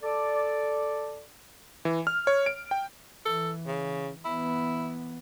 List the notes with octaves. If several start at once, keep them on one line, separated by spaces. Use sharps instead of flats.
A4 D5
E3
F6
C#5
D7
G5
E3 A4
C#3
E3 B3 E4